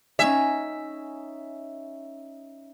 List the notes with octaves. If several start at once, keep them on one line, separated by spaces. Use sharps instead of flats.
C#4 D#4 E5 G#5